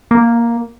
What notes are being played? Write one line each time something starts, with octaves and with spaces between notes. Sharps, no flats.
A#3